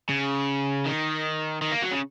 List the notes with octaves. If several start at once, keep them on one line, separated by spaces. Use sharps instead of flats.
C#3
D#3
D#3
A#3
F#3
C#3